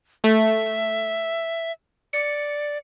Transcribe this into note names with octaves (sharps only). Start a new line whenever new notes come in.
A3 E5
D5 C#7